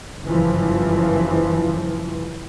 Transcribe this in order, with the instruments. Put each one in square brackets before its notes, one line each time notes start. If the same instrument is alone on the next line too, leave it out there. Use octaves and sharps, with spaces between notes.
[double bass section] F#1 G2 E3 F3